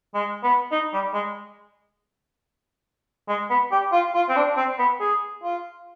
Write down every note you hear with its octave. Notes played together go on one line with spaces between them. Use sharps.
G#3
B3
D#4
G3
G#3
G#3
B3
G4
F4
F4
C4
D4
C4
B3
G#4
F4